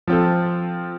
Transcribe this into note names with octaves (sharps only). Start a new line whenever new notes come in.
F3 C4 F4 A4